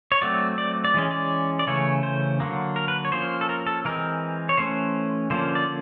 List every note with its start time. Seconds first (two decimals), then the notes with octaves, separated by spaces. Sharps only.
0.12 C#5
0.22 F#3 A3 C4 D5
0.58 D5
0.84 D5
0.94 E3 G#3 C#4
1.11 D5
1.59 D5
1.67 C#3 E3 A3 C#4 C#5
2.03 C5
2.40 D3 F#3 A#3
2.76 A#4
2.88 B4
3.05 C#5
3.12 F3 A#3 C#4 C5
3.41 A4
3.49 A#4
3.67 A4
3.85 E3 G#3 C4 A#4
4.49 C#5
4.57 E3 A3 C#4 C5
5.30 D3 F3 A#3 C#4 C5
5.55 D5